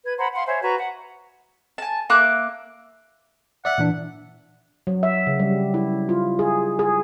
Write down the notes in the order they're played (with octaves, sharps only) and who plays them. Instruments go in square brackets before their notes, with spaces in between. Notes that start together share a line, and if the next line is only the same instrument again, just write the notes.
[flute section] B4 G#6
C5 F#5 A#5 B5
F5 F#5 B5 C6
C5 C#5 E5 G#5
F#4 B4 A#5 C#6
F#5
[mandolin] G#5 A5
A#3 E5 D6 F#6
[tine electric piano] D5 E5 [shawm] F#5
[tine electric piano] A#2 E3 D4
[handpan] F#3
E5
C#3
G3
E4
F4
G#4
G#4